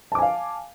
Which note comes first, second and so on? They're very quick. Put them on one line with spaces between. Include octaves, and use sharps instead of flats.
A5 D6 G#5 F5